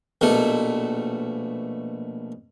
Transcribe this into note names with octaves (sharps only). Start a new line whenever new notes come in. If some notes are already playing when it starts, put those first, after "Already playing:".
A#1 B2 A3